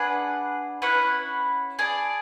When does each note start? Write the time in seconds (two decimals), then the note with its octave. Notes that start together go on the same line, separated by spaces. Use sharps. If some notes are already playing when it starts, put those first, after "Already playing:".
Already playing: D4 G#4 B4 F#5
0.82 C#4 E4 B4 F#5
1.79 G#4 D5 A5